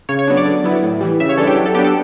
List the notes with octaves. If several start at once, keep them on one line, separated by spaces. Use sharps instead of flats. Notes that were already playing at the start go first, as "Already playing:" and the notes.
C#3 C#5
C#5
F#3 B3 D4
D5
D3
F#3 B3 E4
A2
E3 G3
C#3 E5
C#5
E3 G3 D4 A4
G4
F#3
A4
B3 D4 G4
A4